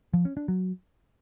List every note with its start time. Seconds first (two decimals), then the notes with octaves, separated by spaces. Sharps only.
0.14 F3
0.25 C#4
0.37 D4
0.48 F#3